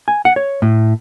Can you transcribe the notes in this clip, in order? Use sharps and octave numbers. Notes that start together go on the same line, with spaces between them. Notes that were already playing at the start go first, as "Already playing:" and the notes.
G#5
F#5
C#5
A2